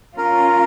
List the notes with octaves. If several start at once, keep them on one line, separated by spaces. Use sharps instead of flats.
C#4 F4 A#4